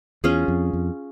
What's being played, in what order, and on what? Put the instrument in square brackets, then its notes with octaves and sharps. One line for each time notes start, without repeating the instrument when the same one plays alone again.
[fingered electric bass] E2 [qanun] C#4 F4 G#4
[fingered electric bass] F2
F2